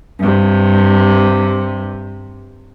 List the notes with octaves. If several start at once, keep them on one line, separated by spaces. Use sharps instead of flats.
G2 C3